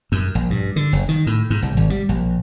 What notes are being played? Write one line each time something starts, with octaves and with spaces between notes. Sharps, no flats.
F#2
A#1
G2
D3
F#1
D#3
A2
G#2
C2
G#1
G3
A#1